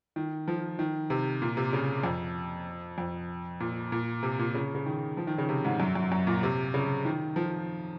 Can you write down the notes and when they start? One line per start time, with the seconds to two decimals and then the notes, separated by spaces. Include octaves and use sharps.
0.16 D#3
0.48 F3
0.79 D#3
1.10 C3
1.42 A#2
1.57 C3
1.73 C#3
2.04 F2
2.98 F2
3.60 A#2
3.92 A#2
4.23 C3
4.39 A#2
4.55 C#3
4.75 C#3
4.86 D#3
5.17 F3
5.27 D#3
5.38 C#3
5.49 C3
5.65 G#2
5.80 F#2
5.95 F#2
6.12 F#2
6.27 A#2
6.43 C3
6.74 C#3
7.05 D#3
7.36 F3